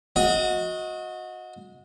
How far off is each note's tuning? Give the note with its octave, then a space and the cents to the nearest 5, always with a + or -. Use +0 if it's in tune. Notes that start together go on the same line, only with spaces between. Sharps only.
F#4 -25 D#5 +20